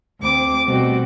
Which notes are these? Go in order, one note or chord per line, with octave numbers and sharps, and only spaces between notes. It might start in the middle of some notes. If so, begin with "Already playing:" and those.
D2 C4 D6
B2 G3 A3 C4 F#4